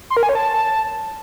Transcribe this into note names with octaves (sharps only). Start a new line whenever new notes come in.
C6
A#4
G#5
C#5
A5